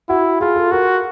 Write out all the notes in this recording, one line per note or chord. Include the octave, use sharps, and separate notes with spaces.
E4 F#4
F4 G#4
A4
F#4 A#4